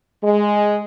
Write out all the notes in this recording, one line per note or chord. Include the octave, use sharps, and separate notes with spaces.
G#3